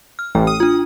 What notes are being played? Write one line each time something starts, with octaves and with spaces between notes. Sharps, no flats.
F6
A1 G5
D#6
D4 F4